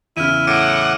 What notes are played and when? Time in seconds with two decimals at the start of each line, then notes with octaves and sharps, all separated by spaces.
0.17 E2 C#3 E4 F6 D#7
0.47 A2 F#5 D6 C#7 D7